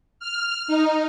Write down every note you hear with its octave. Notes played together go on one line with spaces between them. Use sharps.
F6
D#4